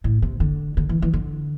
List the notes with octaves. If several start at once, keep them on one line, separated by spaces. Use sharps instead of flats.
A2
C3
D3
D3
E3
E3
D3